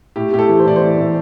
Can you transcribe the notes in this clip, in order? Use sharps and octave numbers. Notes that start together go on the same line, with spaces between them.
A2 G4
A2 G4
A4
E3
C5
A2 D5
C5
E3
A2